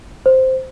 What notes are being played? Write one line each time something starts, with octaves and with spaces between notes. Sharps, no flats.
C5